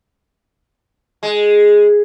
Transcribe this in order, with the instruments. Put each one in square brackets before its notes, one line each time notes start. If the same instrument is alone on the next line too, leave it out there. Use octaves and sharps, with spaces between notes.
[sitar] G#3